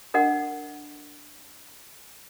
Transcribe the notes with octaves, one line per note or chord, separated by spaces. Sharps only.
D4 A#4 D#5 F#5